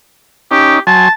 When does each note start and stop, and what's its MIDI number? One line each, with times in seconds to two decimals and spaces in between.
0.51 0.79 61
0.51 0.79 63
0.51 0.77 67
0.87 1.09 54
0.87 1.09 80
0.87 1.12 81
0.87 1.09 84